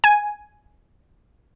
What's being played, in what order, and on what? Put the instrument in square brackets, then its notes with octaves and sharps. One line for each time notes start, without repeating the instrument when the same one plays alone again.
[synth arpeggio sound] G#5